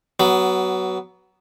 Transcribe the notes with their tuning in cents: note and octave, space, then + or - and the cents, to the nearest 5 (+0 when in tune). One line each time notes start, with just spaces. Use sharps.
F#3 +20 B3 +0